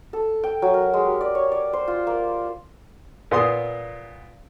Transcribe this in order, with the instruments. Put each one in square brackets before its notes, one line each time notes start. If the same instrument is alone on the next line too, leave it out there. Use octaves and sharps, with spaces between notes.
[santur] A4
G5
F#3
A#4
G#3
G4
D5
C#5
D5
C5
F4
A#3
[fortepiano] A#2 B3 C6 D#6